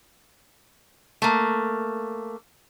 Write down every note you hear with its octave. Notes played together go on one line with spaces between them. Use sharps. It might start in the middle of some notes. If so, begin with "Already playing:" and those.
A3 A#3